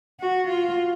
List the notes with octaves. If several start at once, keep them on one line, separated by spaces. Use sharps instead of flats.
F#4
F4